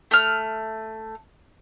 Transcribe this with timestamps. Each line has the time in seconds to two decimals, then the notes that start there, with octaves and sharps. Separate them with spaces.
0.11 A3 F6